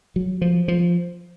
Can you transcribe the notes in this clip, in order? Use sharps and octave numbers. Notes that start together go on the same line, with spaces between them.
F#3
F3
F3